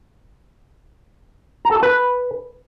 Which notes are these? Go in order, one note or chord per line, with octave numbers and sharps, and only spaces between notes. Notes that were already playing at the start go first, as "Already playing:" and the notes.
A#5
A4
A5
B4